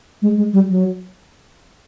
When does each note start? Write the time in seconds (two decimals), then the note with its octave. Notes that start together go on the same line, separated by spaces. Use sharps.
0.22 G#3
0.37 G#3
0.53 G3
0.69 F#3